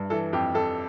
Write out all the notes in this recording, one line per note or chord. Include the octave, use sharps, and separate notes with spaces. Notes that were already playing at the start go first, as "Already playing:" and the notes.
Already playing: G2
E3 A4
F2 G4
F2 A4